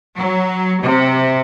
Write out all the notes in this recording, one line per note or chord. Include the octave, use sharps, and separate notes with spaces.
F#3
C3